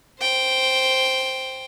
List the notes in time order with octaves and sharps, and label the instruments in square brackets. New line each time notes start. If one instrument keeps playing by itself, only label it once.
[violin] C5 G5